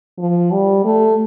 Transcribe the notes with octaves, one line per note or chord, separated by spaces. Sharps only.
F3
G3
A3